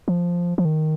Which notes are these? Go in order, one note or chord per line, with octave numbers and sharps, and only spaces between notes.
F3
F3
D#3